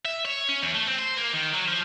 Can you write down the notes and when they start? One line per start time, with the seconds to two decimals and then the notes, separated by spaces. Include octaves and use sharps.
0.05 E5
0.25 C#5
0.49 C#4
0.63 E2
0.75 A3
0.87 C4
0.98 C5
1.18 A#3
1.34 D#3
1.54 F#3
1.68 F3